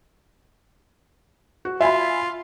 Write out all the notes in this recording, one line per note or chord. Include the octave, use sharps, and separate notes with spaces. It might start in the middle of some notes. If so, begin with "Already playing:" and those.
F#4
F4 E5 G#5 B5